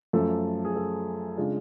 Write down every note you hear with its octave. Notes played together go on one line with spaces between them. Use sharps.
F#2 F3 A3 A4
G#4
A4
C#3 G#3 D4 F4